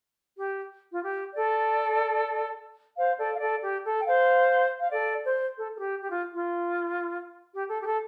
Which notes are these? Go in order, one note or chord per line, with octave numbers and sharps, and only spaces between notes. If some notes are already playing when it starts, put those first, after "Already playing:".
G4
F4
G4
A4 D5
C5 F5
A4 D5
F5
A4 D5
G4
A4
G5
C5 F5
F5
A4 D5
C5
A4
A4
G4
G4
F4
F4
G4
A4
G4
A4